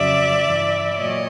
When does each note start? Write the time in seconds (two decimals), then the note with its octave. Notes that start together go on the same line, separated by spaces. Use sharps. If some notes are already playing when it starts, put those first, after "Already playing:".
Already playing: F2 C#3 F#3 D5 E5
0.42 G2 E3
0.96 A#2 F#3 C#5 D#5